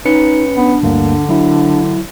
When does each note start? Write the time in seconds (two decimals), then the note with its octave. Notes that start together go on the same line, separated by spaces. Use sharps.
0.05 C#4 D#4 B4 C#7
0.57 B3 D4
0.83 D2 G2 D3 A#3
1.29 F#3 D4 E4